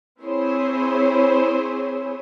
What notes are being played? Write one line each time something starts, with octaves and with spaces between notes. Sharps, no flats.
C4 E4 G#4 C5 C#5